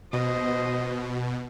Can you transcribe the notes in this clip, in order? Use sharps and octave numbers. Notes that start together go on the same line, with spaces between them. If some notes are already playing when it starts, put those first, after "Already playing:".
B2 C5 D#5